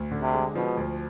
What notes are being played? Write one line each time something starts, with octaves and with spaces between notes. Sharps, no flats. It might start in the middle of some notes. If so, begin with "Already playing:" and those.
Already playing: D2
D3
C3
G#3
B2 F3
D2